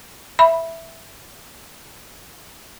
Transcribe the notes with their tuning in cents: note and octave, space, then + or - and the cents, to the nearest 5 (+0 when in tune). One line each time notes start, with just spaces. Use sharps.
E5 +0 B5 -10